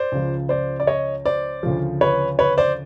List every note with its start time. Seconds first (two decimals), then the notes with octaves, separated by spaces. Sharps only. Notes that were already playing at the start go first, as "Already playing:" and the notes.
Already playing: C5 D5
0.12 C#2 C#3 F3
0.49 C5 D5
0.80 D5
0.87 C#5 D#5
1.26 C5 D5
1.63 D2 C#3 F3
2.01 B4 C#5
2.39 B4 C#5
2.58 C5 D5